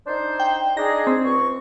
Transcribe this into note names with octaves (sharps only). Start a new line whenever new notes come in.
D4 D#4 C5
G5
D4 D#4 G#4 A#6
C4
C#2 C#6